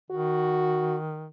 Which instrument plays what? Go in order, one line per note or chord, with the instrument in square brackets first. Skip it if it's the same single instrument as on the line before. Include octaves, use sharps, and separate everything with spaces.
[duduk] D#3 [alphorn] F#4